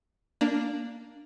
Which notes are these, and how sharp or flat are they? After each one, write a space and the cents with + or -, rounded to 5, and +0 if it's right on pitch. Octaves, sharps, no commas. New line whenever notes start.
A#3 +0 D4 +0